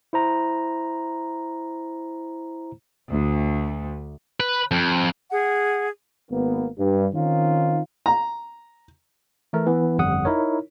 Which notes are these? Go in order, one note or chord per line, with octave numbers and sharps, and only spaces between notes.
E4 C5 A#5
D2
B4
F2
G#4 F#5
G#1 A#3 B3
G2
D#3 C4 C#4 D#4 F4
A#5
E3 A3 A#4
E3 B3
G1 F2 G3 F#5 D#6
D#4 E4 A#4 C#5